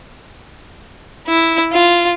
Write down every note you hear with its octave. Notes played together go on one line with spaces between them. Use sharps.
E4
F4